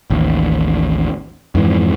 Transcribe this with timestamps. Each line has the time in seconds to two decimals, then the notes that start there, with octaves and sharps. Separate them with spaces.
0.10 A1 D#2
1.55 F2 G#2 E3